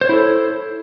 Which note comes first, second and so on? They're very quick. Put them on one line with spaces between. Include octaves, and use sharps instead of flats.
C5 C#5 E4 A4